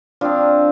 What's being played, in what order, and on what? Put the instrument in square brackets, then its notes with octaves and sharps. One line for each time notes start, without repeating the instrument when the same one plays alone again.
[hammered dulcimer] F3 C4 D4 F4